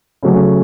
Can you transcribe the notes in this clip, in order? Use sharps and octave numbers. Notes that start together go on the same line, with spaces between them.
C#3 F#3 A3 C#4